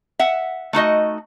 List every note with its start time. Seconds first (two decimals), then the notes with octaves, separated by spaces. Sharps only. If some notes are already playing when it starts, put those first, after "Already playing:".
0.19 E5 F#5
0.73 A3 D#4 F#4 D#5